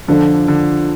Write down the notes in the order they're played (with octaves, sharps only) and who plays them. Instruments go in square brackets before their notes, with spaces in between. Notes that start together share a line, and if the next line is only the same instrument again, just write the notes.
[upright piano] F2 F3 D4 A4 [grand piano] D3
[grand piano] D3